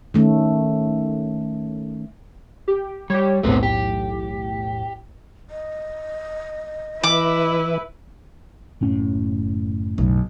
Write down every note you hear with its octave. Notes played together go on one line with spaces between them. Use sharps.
D#3 A3 C#4
G4
G3 G4 C#5
B1 E2 A2 A3 B3 C4
G4
D#5
E3 E4 B4 D6
F#1 A2 C#4
B1